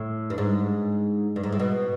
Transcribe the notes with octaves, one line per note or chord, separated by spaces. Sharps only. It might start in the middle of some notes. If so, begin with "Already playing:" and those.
Already playing: A2
G2
G#2
G2
G#2
A2
B2